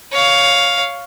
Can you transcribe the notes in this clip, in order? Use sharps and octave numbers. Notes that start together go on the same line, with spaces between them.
C#5 F5